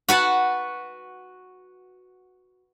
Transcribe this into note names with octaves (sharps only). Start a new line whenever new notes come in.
F#4 B4 F#5 A5